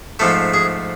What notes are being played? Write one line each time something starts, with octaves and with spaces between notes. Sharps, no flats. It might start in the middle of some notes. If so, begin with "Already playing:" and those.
G#2 F3 A3 A4
G#4